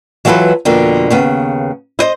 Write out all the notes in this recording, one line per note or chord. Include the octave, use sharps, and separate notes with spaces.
E3 F#3 F4 G4 A4 B4
F2 B2 D3 A#3
D#2 C#3 B3
E4 C5 D#5